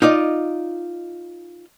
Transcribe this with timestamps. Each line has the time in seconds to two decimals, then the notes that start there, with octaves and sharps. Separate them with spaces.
0.02 D#4 F4 D5 D#5